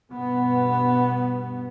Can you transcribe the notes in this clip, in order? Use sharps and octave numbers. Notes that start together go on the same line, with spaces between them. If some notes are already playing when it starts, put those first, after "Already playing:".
G2 B2 B3